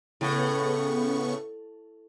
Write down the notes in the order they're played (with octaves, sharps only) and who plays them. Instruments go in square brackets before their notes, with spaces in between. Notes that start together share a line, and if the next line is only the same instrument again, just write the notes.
[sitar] A2 [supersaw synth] C#3 B3 C#6